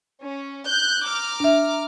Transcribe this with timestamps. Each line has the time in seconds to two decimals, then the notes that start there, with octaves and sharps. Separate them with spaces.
0.22 C#4
0.68 F#6 G6
1.07 A#5 D6 F6
1.40 D4 E5